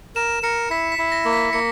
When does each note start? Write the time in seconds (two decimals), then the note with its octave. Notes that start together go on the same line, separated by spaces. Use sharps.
0.16 A#4 E7
0.43 A#4 C#7
0.70 E4 B6
0.92 B6
0.98 E4
1.12 A#6
1.25 A#3
1.33 B6
1.53 A#3 C#7